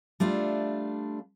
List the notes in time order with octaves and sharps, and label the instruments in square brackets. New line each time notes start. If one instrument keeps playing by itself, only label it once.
[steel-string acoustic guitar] G3 A3 D4 F4